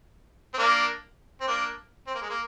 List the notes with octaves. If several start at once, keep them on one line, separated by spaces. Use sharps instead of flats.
C4
A#3 D4
C4
A#3 D4
C4
A#3
G#3
A#3